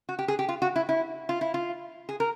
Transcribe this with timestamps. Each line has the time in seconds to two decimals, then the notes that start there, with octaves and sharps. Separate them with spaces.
0.09 F#4
0.19 G4
0.28 G#4
0.39 G4
0.49 F4
0.62 F#4
0.76 E4
0.89 E4
1.29 F4
1.41 E4
1.54 F4
2.09 G#4
2.20 A#4